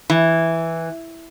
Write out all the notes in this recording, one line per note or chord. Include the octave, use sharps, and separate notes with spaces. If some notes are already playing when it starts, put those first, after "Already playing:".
E3